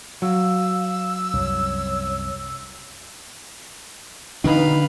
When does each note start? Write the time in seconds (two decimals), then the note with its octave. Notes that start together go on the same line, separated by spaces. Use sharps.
0.22 F#3 F5 E6
1.34 C2 F#2 C#5
4.44 B2 D3 D#3 D4 D#4 B4 F5